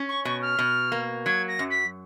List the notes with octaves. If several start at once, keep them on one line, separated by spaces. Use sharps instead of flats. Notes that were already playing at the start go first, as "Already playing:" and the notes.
Already playing: C#4
C#6
B2 C#6
F6
B2
A#3
F#3 G#6
A#6
F#2
B6